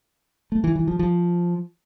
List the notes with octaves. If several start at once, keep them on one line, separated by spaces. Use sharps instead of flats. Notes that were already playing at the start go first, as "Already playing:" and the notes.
A3
E3
E3
F3
F3